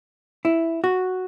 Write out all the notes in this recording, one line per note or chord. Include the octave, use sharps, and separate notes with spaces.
E4
F#4